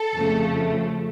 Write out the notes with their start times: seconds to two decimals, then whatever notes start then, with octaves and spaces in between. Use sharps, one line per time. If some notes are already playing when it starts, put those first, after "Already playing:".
Already playing: A4
0.15 F2 C#3 F3 A3